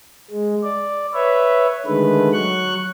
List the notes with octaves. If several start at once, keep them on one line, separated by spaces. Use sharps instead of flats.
G#3
D5
B4 C#5 E5
D3 D#3 G#3 A3 B4
F#3 C#6 F#6